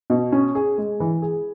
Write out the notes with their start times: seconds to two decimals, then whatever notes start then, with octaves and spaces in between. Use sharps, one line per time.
0.10 B2
0.32 C#4
0.55 G#4
0.78 G#3
1.00 E3
1.22 G#4